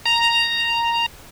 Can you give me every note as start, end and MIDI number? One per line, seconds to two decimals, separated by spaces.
0.06 1.06 82